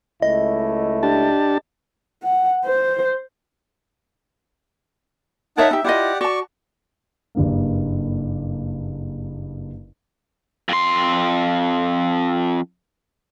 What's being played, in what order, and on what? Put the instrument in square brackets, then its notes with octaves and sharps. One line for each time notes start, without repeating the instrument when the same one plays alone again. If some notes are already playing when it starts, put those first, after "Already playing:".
[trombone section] C#2 A3 E4 [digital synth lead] D#5
[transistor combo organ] D4 G4 A5
[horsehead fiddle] F#5
C5
[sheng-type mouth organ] D#4 F#5 A5 [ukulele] A#4 C#5 E5
[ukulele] D#4 G4 [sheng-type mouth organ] E5
[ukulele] E4 F4 D#5 [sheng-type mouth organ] G4 D5 F#5
[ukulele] F#4 A5 [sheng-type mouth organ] D5 C#6
[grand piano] F#1 G2 A#3
[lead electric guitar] F2 C6